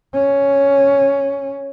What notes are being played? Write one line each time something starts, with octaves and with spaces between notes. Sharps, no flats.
C#4